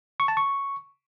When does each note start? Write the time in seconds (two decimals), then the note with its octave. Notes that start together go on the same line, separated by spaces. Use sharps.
0.20 C#6
0.28 A5
0.37 C#6